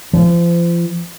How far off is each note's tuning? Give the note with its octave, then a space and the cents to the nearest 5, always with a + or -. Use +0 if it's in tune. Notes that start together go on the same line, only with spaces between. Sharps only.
F3 -35